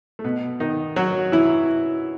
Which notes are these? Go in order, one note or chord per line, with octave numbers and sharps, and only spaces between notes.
A3
B2 B3
D#3 D#4
F#3 F#4
E3 E4